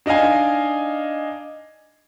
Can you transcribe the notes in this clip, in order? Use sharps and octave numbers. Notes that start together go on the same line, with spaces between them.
D4 D#4 D#5 F5 G#5